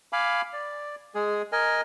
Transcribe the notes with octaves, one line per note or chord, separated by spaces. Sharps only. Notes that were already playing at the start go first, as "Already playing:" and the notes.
F5 G#5 B5 D6
D5
G#3 G#4
A#4 D#5 G#5